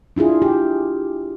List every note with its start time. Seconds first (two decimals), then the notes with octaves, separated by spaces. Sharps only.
0.16 D4 E4 F4 G#4
0.42 G4